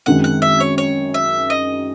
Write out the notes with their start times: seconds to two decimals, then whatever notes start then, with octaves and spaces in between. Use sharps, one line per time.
0.06 F#2 D#3 G#3 C4 F#5
0.24 F#5
0.42 E5
0.60 C#5
0.78 C#5
1.14 E5
1.50 D#5